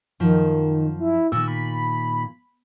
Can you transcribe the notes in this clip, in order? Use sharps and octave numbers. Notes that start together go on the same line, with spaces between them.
F#2 D#3 F3
E4
A#2 D#3 E6
B5